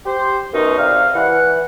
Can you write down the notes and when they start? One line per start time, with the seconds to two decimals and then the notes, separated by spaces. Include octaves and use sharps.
0.05 G4 C5
0.53 F#2 B2 C#4 D#4
0.77 C3 G3 F5
1.14 E3 F#5